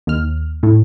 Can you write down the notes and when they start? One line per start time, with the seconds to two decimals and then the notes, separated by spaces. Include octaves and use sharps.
0.07 D#2 F6
0.63 A2